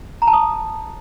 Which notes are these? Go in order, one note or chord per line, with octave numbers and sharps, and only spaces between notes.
A#5
A5
D#6